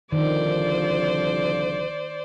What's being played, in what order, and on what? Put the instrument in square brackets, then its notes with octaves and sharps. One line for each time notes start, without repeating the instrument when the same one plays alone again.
[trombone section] C2 D3 F3 [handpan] D#3 [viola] C5 D5